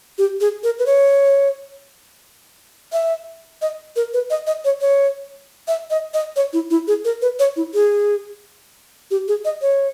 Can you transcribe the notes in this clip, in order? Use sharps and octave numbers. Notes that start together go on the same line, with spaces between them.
G4
G#4
A#4
B4
C#5
E5
D#5
A#4
B4
D#5
D#5
C#5
C#5
E5
D#5
D#5
C#5
E4
E4
G#4
A#4
B4
C#5
E4
G#4
G4
G#4
D#5
C#5